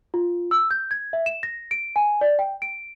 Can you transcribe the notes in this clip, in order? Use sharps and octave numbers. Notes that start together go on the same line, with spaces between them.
F4
E6
G6
G#6
E5
E7
A#6
D7
G#5
D5
G5
D7